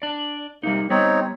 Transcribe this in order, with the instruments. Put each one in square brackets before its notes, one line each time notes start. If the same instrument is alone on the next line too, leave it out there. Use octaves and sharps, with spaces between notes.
[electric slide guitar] D4 D5
[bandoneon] C3 A#3 [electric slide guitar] G3 D#4
[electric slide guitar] G3 B3 [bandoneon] C4 D#4 C#5